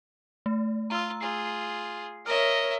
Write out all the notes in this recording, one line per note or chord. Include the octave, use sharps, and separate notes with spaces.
A3
F4 A#5 E6
F4 G#4 C7
A#4 C#5 D#5 E5 F6 A#6